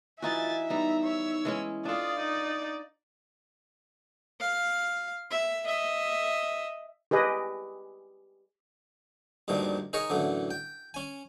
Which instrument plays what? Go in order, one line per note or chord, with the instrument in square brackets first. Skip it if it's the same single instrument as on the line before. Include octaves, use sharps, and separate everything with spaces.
[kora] E3 D#4 F#4 [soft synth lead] F4 [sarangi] E5 [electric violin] G#5 A6
[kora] G3 B3 [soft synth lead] D#4 [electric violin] A#5
[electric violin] C#5 E6
[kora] E3 G#3 C#4
[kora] D4 A4 [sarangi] F4 [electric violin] D5 [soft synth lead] D#6
[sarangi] D#4
[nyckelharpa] F5
E5
D#5 E5
[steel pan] G4 G#4 B4 D#5
[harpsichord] D2 G2 A#2 D#3 F3
D#4 G#4 A#4 C#5 D#5
F#2 A2 D3 E3
G5
C#4 G#5